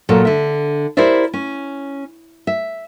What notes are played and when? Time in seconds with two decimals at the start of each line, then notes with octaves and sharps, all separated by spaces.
0.09 A#2 F#3 A4 C#5
0.25 D3 E5
0.97 E4 G4 A#4 C5 D5 E5
1.33 C#4
2.47 E5